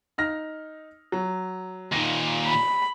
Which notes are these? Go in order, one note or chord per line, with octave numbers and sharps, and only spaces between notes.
D#4 F6 A#6
F#3
D#2 A#2 D#4 A#6
B5